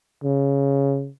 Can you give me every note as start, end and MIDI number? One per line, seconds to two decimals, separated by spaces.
0.24 1.09 49